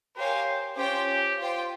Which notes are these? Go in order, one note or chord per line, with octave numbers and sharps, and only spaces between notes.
G4 A#4 C5 C#5 F5 G#5
C#4 F4 G4 C5 G5
F4 C5 G5